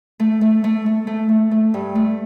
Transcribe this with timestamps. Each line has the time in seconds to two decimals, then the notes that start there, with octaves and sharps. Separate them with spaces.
0.20 A3
0.41 A3
0.64 A3
0.86 A3
1.07 A3
1.29 A3
1.51 A3
1.74 G2
1.95 A3